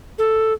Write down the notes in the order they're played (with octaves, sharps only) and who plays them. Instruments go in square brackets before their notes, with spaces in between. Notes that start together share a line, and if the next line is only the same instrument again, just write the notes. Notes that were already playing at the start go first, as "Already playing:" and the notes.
[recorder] A4